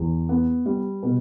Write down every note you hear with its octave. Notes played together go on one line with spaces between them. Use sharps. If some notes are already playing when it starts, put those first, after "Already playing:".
Already playing: E2
B3
G3
B2